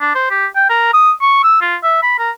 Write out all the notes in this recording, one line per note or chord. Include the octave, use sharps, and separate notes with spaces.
D4
C5
G4
G5
A#4
D#6
C#6
E6
F4
E5
B5
A#4